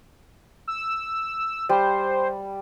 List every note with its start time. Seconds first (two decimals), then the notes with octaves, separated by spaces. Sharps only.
0.68 E6
1.69 G3 C5